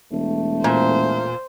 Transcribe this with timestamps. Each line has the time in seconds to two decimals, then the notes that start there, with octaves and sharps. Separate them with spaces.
0.12 E1 A3
0.64 A#2 C5